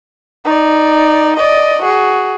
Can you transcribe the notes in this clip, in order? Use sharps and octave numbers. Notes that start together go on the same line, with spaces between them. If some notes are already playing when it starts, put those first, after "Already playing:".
D#4 D5
D5 D#5
F#4 G#4